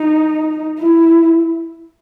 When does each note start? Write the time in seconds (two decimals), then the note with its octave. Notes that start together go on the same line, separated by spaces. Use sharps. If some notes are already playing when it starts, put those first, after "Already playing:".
Already playing: D#4
0.80 E4